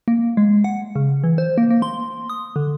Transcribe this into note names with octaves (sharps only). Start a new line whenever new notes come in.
A#3
G#3
F#5
C#3
E3
C5
A#3
A#3
C6
D#6
D3